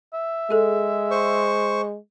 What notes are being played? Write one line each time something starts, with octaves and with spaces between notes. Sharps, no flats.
E5
G#3 G#4 A4
C5 C#6